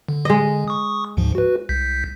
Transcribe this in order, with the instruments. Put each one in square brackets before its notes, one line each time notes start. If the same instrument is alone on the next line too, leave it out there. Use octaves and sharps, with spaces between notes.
[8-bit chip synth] D3
[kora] G#3 D#5
[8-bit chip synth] C#6 D#6
D2 G#2 F3
F#4 B4
C2 G6 B6